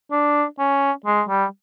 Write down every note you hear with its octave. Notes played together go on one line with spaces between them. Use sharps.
D4
C#4
G#3
G3